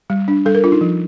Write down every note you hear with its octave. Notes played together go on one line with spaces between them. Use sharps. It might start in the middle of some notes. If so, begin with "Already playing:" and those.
G3
D4
G3 A4
A#4
D4 F4
D#4
F3